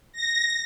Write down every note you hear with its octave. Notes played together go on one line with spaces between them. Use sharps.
A#6